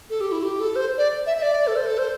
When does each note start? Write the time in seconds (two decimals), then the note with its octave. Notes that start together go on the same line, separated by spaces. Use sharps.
0.10 A4
0.21 G4
0.32 E4
0.43 G4
0.60 A4
0.76 C5
0.98 D5
1.26 E5
1.37 E5
1.42 D5
1.67 A4
1.76 C5
1.86 A4
1.98 C5